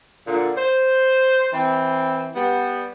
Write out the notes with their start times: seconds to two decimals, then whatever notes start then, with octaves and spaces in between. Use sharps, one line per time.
0.27 A#2 D3
0.57 C5
1.52 E3 C4
2.35 G3 B3